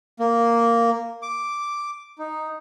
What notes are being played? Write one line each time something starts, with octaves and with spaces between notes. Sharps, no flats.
A#3
D6
D#4